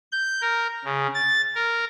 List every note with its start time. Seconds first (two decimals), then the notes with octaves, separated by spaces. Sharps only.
0.12 G6
0.41 A#4
0.84 C#3
1.14 A6
1.55 A#4